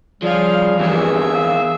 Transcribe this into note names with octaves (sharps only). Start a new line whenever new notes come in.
C#3 F3 G3 G#4 F5
E2 G2 E3 A#3 G#4 E5
F5 E6